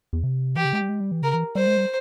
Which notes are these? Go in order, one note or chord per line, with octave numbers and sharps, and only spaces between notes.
E2
C3
E3 G4
C#3
G#3
G3
G#3
G3
E3
C#3 A#4
E3
G3 C5
G#3
G3